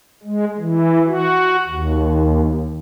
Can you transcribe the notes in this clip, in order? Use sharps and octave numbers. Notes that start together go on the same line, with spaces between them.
G#3
E3
F#4
D#2